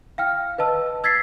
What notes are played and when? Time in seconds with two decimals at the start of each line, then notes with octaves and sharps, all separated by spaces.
0.18 F5 G5 F6
0.58 B4 D#5 A5 E6
1.04 E6 G#6 A6 B6 C7